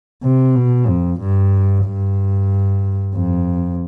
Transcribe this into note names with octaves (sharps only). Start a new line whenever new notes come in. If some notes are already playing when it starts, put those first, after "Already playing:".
C3
B2
F2
G2
G2
F2